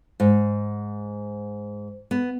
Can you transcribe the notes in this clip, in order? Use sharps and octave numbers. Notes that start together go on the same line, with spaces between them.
G#2
B3